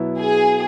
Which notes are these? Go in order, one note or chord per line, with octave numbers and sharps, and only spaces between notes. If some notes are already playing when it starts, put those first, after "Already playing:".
Already playing: B2 F#3 B3 E4
G#4